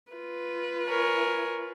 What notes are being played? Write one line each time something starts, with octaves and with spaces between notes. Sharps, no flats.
F4 B4
A#4 C#5 G#5